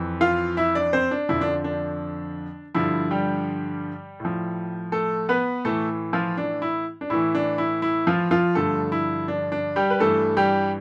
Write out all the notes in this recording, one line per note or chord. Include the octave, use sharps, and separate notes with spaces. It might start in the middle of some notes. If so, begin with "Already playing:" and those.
Already playing: F2 E3
F4 F5
E4 E5
D4 D5
C4 C5
D4
F2 D3 F3 E4
D4
D4
G2 D3 F3 E4
G3 G4
A2 F3
A3 A4
B3 B4
A2 E3 A3 A4
F3 F4
D4
E4
D4
A2 E3 E4
D4
E4
E4
F3 F4
F3 F4
G2 D3 F3 A3 A4
E4
D4
D4
G3 G4
B4
G2 E3 A3 A4
G3 G4